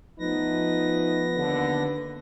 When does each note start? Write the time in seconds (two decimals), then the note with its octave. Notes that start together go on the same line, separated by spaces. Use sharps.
0.19 F3 A3 B3 D#4 B4 A#6
1.35 D#2 D3